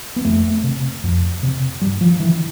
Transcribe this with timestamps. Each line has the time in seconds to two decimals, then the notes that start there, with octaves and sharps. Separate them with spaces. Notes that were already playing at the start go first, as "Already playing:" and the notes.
0.16 B3
0.25 F2 A3
0.64 C3
1.03 F2
1.43 C3
1.81 G2 G3
2.01 F3
2.20 D3 E3